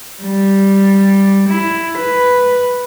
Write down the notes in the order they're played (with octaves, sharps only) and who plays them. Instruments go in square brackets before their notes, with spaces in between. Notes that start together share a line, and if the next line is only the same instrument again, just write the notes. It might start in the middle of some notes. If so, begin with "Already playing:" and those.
[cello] G3
E4
B4